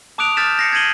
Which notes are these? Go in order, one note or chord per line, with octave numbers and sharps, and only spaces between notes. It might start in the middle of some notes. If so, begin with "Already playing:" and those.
A5 D6 D#6 F#6 D7 F7
F6 G6 A6 B6 E7
A#6 C7 C#7
G#6 B6 C#7 D#7 F#7 G7